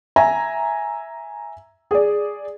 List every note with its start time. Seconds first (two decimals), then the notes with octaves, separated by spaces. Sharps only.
0.16 E5 G#5 A#5
1.91 G#4 D5